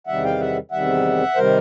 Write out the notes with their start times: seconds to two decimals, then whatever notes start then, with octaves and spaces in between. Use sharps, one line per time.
0.07 E2 C3 D#3 G3 E5 F#5
0.24 F5 G5
0.40 E5 F#5
0.71 E2 C3 D#3 G3 E5 F#5
1.35 C3 D#3 G3 A#4 C5